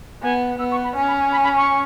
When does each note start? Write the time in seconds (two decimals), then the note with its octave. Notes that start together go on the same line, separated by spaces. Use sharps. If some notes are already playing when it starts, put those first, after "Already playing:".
0.23 B3 G#5
0.59 B3 E6
0.72 C#6
0.84 B5
0.96 C#4
1.08 B5
1.20 G#5
1.32 B5
1.44 B5
1.57 C#6